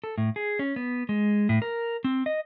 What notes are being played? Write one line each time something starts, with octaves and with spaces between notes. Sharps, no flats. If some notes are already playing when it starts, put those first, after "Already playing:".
A4
A2
G#4
C#4
B3
G#3
A2
A#4
C4
D#5